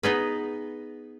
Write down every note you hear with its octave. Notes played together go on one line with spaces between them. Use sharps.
B3 D#4 G#4 B4